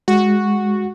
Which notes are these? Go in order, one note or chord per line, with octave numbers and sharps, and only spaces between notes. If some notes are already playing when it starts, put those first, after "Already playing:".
G#3 F#4